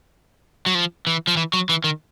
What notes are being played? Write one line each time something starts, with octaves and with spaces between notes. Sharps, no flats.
F#3
F3
E3
F3
E3
F#3
E3
D#3